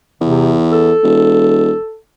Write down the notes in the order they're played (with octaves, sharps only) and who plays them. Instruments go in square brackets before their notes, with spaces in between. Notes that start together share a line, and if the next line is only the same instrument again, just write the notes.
[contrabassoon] E2 [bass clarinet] C3
[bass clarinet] A4
[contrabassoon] E1